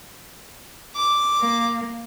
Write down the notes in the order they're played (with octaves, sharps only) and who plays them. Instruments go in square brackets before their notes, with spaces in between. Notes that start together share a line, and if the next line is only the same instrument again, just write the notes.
[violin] D6
[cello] A#3